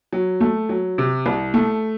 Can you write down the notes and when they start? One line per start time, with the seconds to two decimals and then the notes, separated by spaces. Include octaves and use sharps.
0.13 F#3
0.41 A3
0.69 F#3
0.98 C3
1.26 C2
1.54 A3